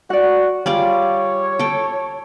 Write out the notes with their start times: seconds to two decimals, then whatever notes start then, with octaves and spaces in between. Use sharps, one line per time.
0.10 F#4 D5 F#5
0.66 G3 F4 G#4 C#5 D5
1.59 A4 G5